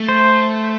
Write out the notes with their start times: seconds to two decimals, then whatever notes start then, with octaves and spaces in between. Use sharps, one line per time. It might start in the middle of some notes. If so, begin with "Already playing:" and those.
Already playing: A3
0.09 C5